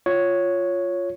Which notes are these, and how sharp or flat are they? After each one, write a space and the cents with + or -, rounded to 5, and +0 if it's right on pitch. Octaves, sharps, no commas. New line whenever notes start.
F4 +0 C#5 +0